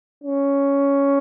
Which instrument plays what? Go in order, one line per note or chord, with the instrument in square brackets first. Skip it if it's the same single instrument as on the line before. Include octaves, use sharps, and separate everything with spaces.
[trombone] C#4